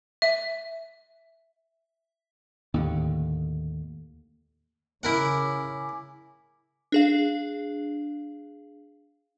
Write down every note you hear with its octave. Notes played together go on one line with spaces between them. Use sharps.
E5
D#2 A2 D3
C#3 E4 A#4 F#5 G#5 D6
D4 G#4 F5